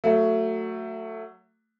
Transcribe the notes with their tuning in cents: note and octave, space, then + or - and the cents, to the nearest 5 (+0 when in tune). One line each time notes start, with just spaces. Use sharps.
F#3 +0 A3 +20